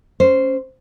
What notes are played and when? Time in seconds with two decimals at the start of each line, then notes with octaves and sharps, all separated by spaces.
0.20 C#4 C5